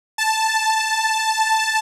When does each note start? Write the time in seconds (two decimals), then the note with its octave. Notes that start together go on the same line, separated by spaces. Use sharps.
0.18 A5